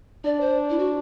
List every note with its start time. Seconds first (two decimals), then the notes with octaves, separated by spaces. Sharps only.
0.25 D4 D5
0.41 C5
0.70 E4
0.79 F#4